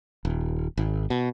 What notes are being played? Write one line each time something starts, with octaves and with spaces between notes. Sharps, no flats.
D#1
G#1
B2